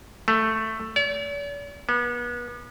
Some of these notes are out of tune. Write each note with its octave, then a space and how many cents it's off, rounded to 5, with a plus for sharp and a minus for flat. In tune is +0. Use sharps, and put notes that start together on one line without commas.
A3 +5
D5 -45
B3 -35